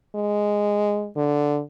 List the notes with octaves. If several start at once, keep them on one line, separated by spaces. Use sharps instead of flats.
G#3
D3